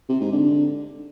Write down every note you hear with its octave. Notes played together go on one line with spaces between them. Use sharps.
C3
G#2
D3